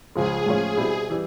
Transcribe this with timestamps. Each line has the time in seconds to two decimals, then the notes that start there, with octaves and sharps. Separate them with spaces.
0.16 C#2 C#3 F3 G#3 G#4
0.46 A2 F3 G#3 C#4
0.77 B2 G3 C4 E4
1.10 E3 G3